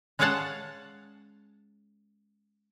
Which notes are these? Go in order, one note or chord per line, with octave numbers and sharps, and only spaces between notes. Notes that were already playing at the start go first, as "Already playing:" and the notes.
G#3 C#4 C#5 F5 F#5 A5